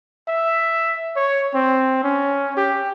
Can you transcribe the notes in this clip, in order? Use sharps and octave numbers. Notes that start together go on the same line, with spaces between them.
E5
C#5
C4
C#4
G4